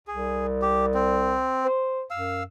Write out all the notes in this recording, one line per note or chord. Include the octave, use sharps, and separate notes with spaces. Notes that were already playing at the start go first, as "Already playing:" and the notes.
C2 G#4
G4
C4
C5
F#2 F5 E6